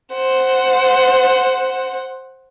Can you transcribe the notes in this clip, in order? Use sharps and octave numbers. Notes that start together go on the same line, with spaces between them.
C5 F#5